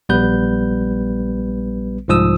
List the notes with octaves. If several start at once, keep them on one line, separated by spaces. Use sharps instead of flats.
A#1 G3 B3 B4 G6
C2 G#2 F3 D#6 E6